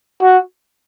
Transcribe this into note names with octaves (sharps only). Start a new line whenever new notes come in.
F#4